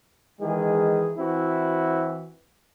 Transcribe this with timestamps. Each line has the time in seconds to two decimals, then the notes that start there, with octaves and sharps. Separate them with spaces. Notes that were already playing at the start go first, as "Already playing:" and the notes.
0.40 D#3 E3 G#3 G#4
1.18 E3 C4 E4 F#4